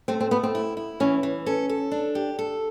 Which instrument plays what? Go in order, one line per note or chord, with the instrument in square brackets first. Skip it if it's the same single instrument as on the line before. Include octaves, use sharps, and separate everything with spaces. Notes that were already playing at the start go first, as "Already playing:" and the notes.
[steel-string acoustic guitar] A3 [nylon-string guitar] C4
[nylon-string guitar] C4
[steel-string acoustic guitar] A3 [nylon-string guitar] B3
[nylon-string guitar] C4
[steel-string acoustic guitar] E4
E4
[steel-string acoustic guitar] E3 [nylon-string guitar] C#4
[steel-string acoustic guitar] E3
[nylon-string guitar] C#4 [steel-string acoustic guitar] A4
[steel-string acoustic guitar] A4
D4
G4
A4